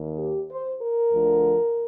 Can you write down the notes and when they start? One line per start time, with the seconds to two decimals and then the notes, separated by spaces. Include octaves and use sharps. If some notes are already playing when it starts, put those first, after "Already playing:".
Already playing: D#2 D#3
0.19 G4
0.51 C5
0.82 A#4
1.13 D2 D3 F3